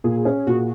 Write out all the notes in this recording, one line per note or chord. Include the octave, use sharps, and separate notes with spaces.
A#2 G#4
C#4
A#2 F#4